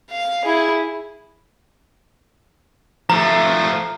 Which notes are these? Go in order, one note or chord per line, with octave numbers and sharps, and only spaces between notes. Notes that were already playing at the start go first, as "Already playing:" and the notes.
F5
E4 G#4
F3 A3 A#5